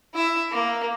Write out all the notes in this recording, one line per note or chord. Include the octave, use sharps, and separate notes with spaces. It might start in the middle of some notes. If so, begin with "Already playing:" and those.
E4 E5
A#3